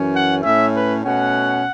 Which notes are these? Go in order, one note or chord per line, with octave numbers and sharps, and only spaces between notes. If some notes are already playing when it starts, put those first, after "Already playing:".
Already playing: F#2 E3 C#4
F#5
A2 A3 C#4 E5
B4
B2 A3 C#4 F#5